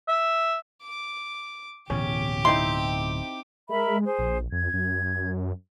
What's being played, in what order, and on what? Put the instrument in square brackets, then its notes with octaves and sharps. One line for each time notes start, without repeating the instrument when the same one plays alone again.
[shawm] E5
[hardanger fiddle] D6
[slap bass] D1 B2 E3 [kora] C#4 [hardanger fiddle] G4 D6
[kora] C4 D#4 E4 [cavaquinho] C6
[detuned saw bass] G#3 [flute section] A#4 E5 B5
[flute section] G#4 C5
[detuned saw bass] A#1
[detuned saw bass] F2 [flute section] G#6
[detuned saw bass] F#2